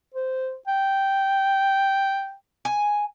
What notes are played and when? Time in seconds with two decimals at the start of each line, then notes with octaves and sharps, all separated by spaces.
0.14 C5
0.68 G5
2.65 G#5